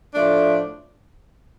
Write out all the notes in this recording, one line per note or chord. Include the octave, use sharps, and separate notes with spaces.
A2 F3 A3 D4